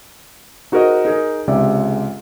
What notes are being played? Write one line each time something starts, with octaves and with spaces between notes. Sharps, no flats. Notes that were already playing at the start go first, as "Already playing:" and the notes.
D#4 F#4 G#4 A#4 C5 D#5
D#4 G#4 A#4
C#2 C3 G#3 D5 E5